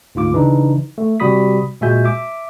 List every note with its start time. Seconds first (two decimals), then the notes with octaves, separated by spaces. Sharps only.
0.15 D2 G#2 F4 D6
0.33 C#3 E3 D4 D#4
0.98 A3
1.20 C3 G3 F#4 B5 D#6 B6
1.81 A#2 G#3 F#4 E5 G#5 G6
2.05 E5 D6